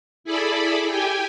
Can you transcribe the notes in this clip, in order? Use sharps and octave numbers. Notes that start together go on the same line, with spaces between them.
E4 G#4 A4 D5 B5
G4 G5 G#5